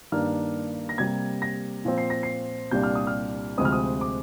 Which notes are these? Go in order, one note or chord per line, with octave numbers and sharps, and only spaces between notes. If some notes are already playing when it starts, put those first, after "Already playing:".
G2 D#3 A#3 D4 F6
A#6
C3 G3 A#3 G#6
A#6
A#2 F3 C4
C7
A#6
C7
C2 A#2 G3 D4 G6
F6
D#6
F6
D2 C3 F3 G#3 C4 D#6
F6
D#6
D6